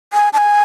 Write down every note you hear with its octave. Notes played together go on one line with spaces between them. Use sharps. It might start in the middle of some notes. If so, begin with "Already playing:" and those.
G#5
A5
G#5